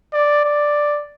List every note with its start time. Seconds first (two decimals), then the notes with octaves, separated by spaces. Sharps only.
0.13 D5
0.44 D5